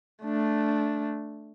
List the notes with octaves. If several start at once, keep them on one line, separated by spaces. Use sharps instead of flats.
A3 D4